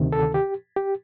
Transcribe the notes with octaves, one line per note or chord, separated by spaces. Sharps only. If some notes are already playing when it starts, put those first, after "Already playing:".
Already playing: D2 C3 D#3
A4
G4
G4